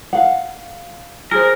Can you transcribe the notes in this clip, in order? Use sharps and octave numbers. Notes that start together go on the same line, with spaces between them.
F5 F#5
G#4 A#4 C5